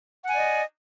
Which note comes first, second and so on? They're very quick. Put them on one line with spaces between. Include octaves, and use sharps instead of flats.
F#5 G#5 D5 D#5